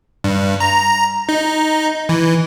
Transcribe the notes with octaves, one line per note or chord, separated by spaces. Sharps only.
G2
A#5
D#4
E3